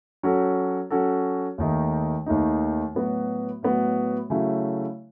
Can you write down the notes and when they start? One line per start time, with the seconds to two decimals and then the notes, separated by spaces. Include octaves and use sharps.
0.23 F#3 C#4 F#4 A4
0.90 F#3 C#4 F#4 A4
1.58 D#2 D#3 A3 D#4
2.26 D#2 D#3 A3 D#4
2.94 A2 F#3 B3 F#4
3.63 A2 F#3 B3 F#4
4.30 C#3 F#3 A3 E4